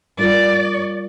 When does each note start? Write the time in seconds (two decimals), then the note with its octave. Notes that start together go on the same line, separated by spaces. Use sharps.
0.18 G3 F4 A#4 D5